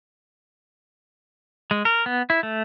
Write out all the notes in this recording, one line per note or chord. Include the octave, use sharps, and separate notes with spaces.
G#3
A#4
B3
E4
A3